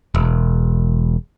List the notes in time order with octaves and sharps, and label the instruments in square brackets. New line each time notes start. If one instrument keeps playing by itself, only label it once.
[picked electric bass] E1